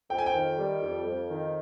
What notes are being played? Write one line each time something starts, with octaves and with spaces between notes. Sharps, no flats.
F2 G5
G#5
G5
D#3
G3
F2
F2
D#3